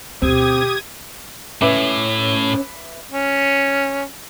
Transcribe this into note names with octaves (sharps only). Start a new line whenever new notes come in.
D2 B2 C4 G4 D#6 G#6
A2 C#4 B4 E5 D6
C#4